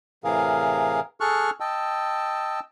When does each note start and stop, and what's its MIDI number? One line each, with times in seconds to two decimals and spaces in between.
0.24 1.00 45
0.24 1.00 48
0.24 1.00 52
0.24 1.00 68
0.24 1.00 70
0.24 1.00 77
1.21 1.50 68
1.21 1.50 69
1.21 1.50 85
1.21 1.50 89
1.21 1.50 90
1.60 2.60 75
1.60 2.60 79
1.60 2.60 81
1.60 2.60 88